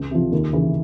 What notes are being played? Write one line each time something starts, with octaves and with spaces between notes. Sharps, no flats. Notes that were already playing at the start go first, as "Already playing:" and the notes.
Already playing: C#2
C3 F3
D#2
C#3 E3